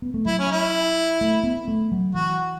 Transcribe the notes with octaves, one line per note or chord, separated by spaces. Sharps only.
B3
A3
F#3 E4
C#4
E4
A3
B3
A3
F#3
E3 F#4